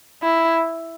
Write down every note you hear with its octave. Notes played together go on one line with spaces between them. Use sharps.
E4